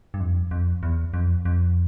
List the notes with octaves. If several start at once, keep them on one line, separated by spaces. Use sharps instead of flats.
G2
F2
F2
E2
F2
F2